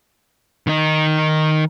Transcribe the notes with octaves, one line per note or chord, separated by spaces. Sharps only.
D#3 D#4